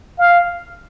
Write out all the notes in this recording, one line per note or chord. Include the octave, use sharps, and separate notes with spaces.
F5